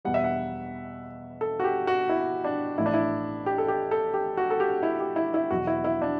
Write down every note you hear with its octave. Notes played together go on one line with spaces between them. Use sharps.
E2 B2 G3 F#5
E5
F#5
A4
F#4
G4
F#4
E4
D4
A1 A2 E3 E4
D4
E4
G4
A4
G4
A4
G4
F#4
A4
G4
E4
G4
E4
E4
E2 B2 F#3 F#4
E4
E4
D4